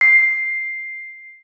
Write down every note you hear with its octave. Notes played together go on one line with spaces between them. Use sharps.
C7